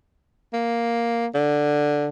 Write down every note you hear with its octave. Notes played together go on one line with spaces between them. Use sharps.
A#3
D3